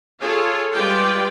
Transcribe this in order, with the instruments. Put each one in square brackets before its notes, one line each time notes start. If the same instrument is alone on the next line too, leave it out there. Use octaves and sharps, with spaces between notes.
[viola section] F4 G#4 A4 C#5 F5
G3 G#3 F4 B4 D5 G5